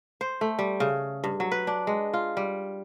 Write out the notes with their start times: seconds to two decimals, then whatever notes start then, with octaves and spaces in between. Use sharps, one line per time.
0.21 C5
0.41 A3
0.59 G3
0.80 C#3
1.24 G2
1.40 F#3
1.52 B4
1.67 D4
1.87 G#3
2.14 F4
2.37 G3